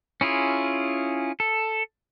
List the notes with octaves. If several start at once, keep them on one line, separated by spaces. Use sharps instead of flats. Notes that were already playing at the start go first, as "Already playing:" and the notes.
C#4 E4 F4 G#4
A4